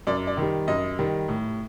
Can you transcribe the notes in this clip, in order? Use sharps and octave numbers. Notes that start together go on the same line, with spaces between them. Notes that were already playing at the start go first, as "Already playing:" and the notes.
F#2 D5
D5
D#3 G3
F#2 D#5
D#3 G3
A2